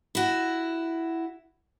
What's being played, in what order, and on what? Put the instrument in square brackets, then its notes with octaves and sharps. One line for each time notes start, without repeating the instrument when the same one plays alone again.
[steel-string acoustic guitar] E4 F#4